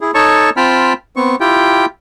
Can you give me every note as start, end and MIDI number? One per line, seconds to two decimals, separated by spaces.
0.01 0.11 64
0.01 0.11 68
0.14 0.50 63
0.14 0.50 69
0.14 0.50 73
0.14 0.50 81
0.14 0.50 85
0.57 0.93 60
0.57 0.93 65
0.57 0.93 79
0.57 0.93 81
0.57 0.93 83
0.57 0.93 89
1.16 1.36 59
1.16 1.36 60
1.16 1.36 85
1.40 1.86 64
1.40 1.86 65
1.40 1.86 67
1.40 1.86 79